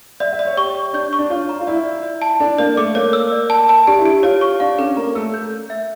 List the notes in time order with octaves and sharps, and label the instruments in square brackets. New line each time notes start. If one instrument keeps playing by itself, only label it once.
[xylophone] D5 [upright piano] E5
[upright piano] E5
[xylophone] D5
[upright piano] C#5
[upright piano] G4 [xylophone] C#6
[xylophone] C#6
[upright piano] D4 [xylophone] G6
[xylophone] C#6
[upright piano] D4
[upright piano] F4 [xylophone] C#5
[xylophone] A#5
[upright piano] F4
[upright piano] E4 [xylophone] D5
[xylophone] D5
D5
A5
[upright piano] D4 [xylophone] A4
[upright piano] A#3 [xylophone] D5
[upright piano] A3 [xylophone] D6
[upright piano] A#3 [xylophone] C#5
[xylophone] E6
D5
A5
A5
[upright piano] D4 [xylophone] G4
[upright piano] E4
[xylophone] G4
[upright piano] F4 [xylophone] C#5
[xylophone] C#6
[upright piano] D4 [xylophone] F5
[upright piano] C#4 [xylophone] A4
[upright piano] A#3 [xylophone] A#5
[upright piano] A3 [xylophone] E6
[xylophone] G6
G6
E5